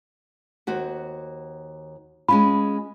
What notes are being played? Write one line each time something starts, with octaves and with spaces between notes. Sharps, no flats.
D#2 F#4 C5
G#3 C#4 F4 B5